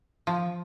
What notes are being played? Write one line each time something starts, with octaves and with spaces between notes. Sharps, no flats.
F3